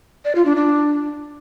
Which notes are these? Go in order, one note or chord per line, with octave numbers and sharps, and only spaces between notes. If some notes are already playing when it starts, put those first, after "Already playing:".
D5
F4
D4
D4